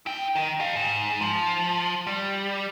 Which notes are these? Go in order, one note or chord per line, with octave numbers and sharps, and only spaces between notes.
E4 G5
D#3
G4 F5
G#2
F3
G3